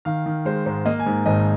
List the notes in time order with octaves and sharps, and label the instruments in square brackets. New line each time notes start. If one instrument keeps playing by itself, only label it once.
[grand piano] D#3 F5
D#3
G#3 C5
G#2 C5
A#3 D#5
G#5
G#2
G#1 D#5